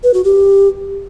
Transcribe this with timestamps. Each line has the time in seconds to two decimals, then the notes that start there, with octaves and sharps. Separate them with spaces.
0.03 B4
0.14 F#4
0.24 G4